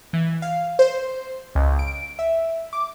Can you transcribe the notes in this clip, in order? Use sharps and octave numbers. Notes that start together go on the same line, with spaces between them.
E3
F5
C5
C#2
D7
E5
D6